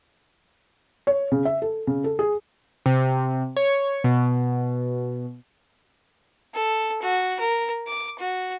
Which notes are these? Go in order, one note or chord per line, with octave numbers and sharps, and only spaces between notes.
C#5
C#3
E5
A4
C#3
A4
G#4
C3
C#5
B2
A4
F#4
A#4
D6
F#4